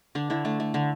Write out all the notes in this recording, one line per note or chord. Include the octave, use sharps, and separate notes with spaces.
D3 D4
D3 E4
A3 D4
A3
D3